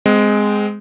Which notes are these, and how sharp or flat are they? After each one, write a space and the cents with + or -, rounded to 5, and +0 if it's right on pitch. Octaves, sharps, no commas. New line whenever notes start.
G#3 +0 C4 -30